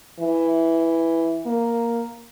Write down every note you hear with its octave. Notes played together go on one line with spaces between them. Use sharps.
E3
A#3